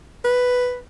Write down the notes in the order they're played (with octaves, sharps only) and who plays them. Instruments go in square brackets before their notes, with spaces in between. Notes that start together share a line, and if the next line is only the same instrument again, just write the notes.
[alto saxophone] B4